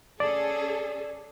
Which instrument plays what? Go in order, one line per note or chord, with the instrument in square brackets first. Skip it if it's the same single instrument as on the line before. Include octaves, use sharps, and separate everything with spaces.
[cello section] C#4 G#4 A4 [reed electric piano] D5